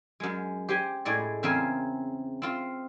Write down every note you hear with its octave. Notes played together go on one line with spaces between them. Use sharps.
F#2 G#3
G4 C5 G5 G#5
A2 G#3 D5
E2 C#3 C4 G#4 A#4 G#5
C4 F4